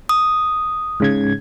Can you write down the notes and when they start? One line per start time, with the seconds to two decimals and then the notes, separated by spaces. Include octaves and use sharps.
0.09 D#6
1.00 G#2 C#3 G#6